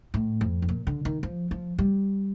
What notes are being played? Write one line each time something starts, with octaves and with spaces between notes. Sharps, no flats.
A2
F2
A2
A#2
D3
D#3
F3
F3
G3